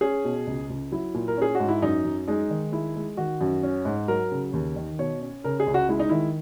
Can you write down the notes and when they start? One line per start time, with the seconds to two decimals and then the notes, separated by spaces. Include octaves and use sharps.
0.01 C#4 G#4
0.25 B2
0.47 C#2
0.70 C#2
0.92 F#3 E4
1.14 A#2
1.28 A#4
1.37 C#4 G#4
1.55 F#4
1.60 G#2
1.69 E4
1.82 F#2 D#4
2.05 F#2
2.28 G#3 D#4
2.50 D#3
2.72 G#3 E4
2.96 G#3
3.17 D#3 F#4
3.41 F#2
3.63 C#4
3.85 G#2
4.08 F#3 A#4
4.32 C#3
4.53 D#2
4.76 D#3
4.99 B2 C#5
5.21 C#4
5.44 C#3 A#4
5.60 G#4
5.67 C#2
5.74 F#4
5.89 G#3 E4
5.99 D#4
6.10 D#3 E4